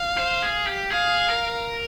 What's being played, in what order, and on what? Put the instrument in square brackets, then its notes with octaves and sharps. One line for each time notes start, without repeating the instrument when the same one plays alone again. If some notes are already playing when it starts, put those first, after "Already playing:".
Already playing: [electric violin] F5
[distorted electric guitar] C5
G#4
G4
[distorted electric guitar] G#4 [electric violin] F5
[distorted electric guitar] A#4